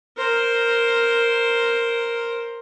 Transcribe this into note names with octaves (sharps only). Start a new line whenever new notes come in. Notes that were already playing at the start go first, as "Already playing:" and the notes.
A#4 C5